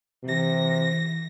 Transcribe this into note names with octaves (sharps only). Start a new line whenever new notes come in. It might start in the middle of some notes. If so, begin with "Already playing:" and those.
C3 E3 A#6